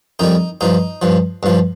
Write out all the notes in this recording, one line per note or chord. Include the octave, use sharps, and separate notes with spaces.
F2 D#3 G3 D#4
G2 F3 D#4
G2 F3
G2 F3